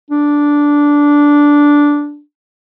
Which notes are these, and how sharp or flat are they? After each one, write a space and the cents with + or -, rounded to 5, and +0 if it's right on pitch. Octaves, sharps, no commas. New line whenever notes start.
D4 -10